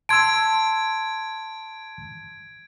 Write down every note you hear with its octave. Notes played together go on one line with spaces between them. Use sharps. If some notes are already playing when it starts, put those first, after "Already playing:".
A5 C6 E6 G#6 D7